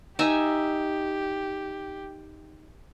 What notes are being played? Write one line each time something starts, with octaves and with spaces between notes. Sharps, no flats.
D#4 G4 E5 G#5